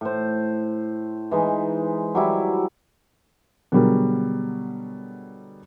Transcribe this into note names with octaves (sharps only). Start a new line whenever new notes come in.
A2 C5
E3 G#3 D#4
F#3 G3 E4
B2 D3 F#3 G3 G#4 A#4